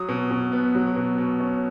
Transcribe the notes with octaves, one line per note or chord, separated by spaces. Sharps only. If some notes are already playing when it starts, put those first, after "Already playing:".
Already playing: F#3 D#6
B2
B2
B3
F#3
B2
B2
C#4